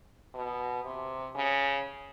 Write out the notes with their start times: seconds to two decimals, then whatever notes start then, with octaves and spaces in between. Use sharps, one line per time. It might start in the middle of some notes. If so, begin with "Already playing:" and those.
0.34 B2
0.84 C3
1.35 C#3